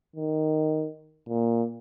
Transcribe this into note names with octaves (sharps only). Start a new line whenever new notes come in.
D#3
A#2